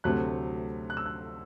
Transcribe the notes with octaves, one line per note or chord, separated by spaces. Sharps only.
D2 C3 F#3 A3 F#6
F#6
E6
F#6